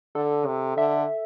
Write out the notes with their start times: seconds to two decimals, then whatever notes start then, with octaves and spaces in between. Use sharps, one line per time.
0.15 D3 A4
0.47 C3
0.77 D3 E5